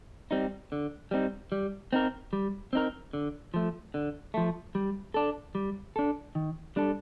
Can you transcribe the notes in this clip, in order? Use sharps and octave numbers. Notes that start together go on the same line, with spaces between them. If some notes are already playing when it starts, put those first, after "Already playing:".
G3 C4 D#4
D3
G3 C4 D#4
G3
C4 D#4 A#4
G3
C4 D#4 A#4
D3
F3 A3
D3
F3 A3
G3
D4 A4
G3
D4 A4
D#3
G3 D4 A4